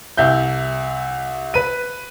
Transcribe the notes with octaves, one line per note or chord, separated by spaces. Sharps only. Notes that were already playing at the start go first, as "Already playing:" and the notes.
C2 E5 G6
B4 D#7